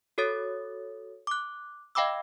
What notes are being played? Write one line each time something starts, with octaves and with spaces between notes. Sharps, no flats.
F#4 A4 C#5 D#6 A6
D6 F#6
D#5 F5 G5 B5 D6 E6